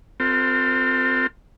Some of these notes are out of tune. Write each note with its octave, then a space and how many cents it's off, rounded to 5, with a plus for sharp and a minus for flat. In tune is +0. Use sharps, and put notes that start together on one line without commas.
C4 -10 F4 +30 A4 +45